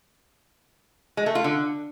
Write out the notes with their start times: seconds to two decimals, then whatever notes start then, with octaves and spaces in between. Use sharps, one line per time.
1.17 G#3
1.26 A3
1.35 F4
1.44 D3